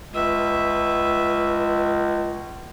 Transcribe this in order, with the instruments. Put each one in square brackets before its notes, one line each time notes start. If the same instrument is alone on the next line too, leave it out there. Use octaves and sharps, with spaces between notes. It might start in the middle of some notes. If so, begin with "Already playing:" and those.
[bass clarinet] C#2 [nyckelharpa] B4 E5